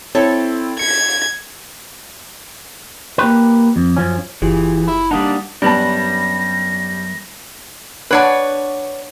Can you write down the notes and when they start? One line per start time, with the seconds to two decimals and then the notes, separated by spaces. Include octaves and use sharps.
0.15 C4 E4 A4 C#5
0.79 G#6 C#7
3.18 A#3 G4 B4
3.76 F2
3.97 F#2 F3 C#4
4.42 F#1 E3 F4 G4 G#4
4.87 E4
5.11 G3 A#3 D4 D#4 F#5 D#6
5.62 F#2 G3 B3 D4 A5 A#6
8.11 D4 B4 C#5 D5 F#5 A5